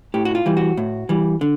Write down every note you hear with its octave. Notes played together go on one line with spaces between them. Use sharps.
A2 G4
F#4
F4
E3 G3
F#4
A2
E3 G3
D3